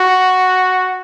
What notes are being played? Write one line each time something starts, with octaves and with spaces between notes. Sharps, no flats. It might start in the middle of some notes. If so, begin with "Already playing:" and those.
Already playing: F#4